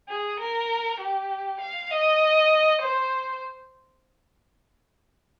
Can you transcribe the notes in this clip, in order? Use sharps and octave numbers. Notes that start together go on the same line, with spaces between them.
G#4
A#4
G4
F5
D#5
C5